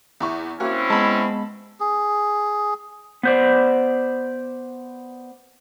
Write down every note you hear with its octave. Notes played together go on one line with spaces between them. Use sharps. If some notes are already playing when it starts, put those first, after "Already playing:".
E2 E4 C#6
A#3 C4 C#4 E4 F#4
G#3 B3 A5 B5
G#4
B3 C5 D5